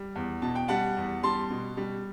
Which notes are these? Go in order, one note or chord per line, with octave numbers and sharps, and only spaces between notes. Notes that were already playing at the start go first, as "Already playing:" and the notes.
Already playing: G3
E2
B2 A5
G5
G3 F#5 A5
E2
G3 A5 C6
B2
G3